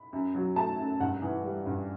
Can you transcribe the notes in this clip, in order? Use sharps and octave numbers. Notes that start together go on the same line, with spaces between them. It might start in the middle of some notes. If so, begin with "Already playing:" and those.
Already playing: B5
F#2
F#3
A3 A5
F#2
G2 F#5
E3
G3
G2